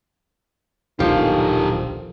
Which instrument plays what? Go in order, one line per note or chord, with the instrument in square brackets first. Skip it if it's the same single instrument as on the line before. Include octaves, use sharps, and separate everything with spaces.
[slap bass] D#1 B1 D4 [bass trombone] D#3 [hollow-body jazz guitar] F3 [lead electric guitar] G4 A4